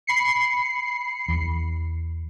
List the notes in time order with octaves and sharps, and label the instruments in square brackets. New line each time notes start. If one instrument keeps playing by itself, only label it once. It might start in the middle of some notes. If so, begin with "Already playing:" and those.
[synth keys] B5 C7 C#7
[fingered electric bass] E2